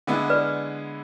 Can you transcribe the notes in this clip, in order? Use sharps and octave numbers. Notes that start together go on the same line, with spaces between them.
D3 G#3 B3 E4
B4 D5